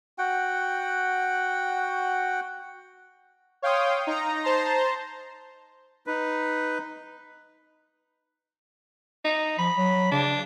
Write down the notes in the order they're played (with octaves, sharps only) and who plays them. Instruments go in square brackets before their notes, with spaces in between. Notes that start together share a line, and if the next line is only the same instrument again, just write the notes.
[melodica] F#4 F#5 G5
[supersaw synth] C#5 F5 G5 C6 D#6
D#4 A#5
C5 A5 A#5 C6
[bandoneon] D#4 B4
[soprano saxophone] D#4
[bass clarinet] F3 [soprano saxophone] B5
[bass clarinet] F#3
[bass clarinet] C#3 [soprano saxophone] D4